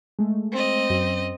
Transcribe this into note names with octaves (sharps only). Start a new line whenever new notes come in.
G#3 A3
C4 D#5
F#2